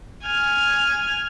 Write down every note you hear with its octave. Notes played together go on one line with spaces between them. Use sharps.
G#5 F6